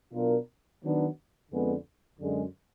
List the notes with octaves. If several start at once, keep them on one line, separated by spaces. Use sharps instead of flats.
B2 F#3 D4 F4 A#4
D#3 F#3 B3 D4
F2 D3 G#3 B3
F#2 D3 G#3